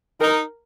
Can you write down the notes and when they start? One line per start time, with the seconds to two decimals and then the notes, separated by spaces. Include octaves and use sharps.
0.21 D#4 A#4